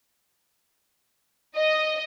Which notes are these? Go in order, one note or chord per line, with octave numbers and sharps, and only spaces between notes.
D#5